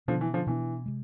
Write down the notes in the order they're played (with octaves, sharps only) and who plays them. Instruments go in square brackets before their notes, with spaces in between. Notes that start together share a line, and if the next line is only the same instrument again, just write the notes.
[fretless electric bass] B2 B3 D4 [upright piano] D3 F3
[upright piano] E3
D3 F3
[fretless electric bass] B2 B3 D4 [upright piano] E3
[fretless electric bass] C3 G#3